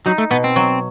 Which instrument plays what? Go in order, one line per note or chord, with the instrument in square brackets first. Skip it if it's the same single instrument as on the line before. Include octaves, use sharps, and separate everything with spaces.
[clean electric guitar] F#3 [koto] D#4
[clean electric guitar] A3
[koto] B2 [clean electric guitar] B3
[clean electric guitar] C4
[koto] F#3